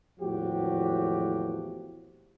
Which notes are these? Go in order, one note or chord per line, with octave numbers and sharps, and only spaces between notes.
G#1 E2 A2 F3 F#4 G4